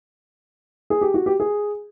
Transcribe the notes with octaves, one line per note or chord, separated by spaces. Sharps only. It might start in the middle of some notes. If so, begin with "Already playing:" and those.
G#4
G4
F#4
G4
G#4